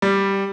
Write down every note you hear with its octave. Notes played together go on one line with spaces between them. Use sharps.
G3